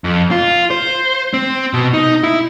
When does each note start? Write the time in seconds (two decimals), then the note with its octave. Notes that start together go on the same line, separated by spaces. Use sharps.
0.04 F2
0.31 F4
0.70 C5
1.34 C4
1.73 B2
1.94 D#4
2.24 E4